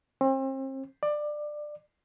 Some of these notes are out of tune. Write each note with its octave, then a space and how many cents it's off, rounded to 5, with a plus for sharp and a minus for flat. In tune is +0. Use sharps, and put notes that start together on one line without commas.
C4 +35
D5 +20